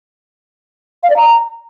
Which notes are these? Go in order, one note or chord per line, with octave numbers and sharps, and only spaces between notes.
F5
D5
A#5